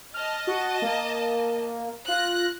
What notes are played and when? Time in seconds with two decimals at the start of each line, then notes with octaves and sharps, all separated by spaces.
0.14 D#5 A5 F6
0.47 F#4
0.82 A#3
2.08 F4 F#6 A#6